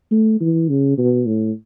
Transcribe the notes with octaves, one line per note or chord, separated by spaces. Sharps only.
A3
E3
C#3
B2
A2